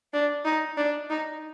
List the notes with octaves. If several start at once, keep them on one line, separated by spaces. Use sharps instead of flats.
D4
D#4
D4
D#4